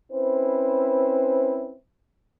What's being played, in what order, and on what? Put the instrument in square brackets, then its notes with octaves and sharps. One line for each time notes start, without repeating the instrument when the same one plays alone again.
[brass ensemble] C4 C#4 E4 B4 C5